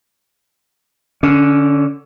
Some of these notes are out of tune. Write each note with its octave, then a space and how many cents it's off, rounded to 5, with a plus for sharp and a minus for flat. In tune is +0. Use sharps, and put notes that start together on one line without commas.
D3 +0 C#4 +25